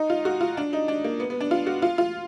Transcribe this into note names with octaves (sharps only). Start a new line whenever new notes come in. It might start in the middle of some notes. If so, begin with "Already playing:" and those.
Already playing: D#4
F4
F#4
F4
D4
D#4
D4
A#3
B3
B3
D4
F4
F#4
F4
F4